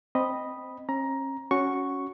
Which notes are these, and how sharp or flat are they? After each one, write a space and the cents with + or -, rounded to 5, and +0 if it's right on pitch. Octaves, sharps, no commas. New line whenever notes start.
C4 +0 D#5 -5 B5 -5
C#4 -45 A#5 +15
C#4 +0 F#4 +0 C#6 +0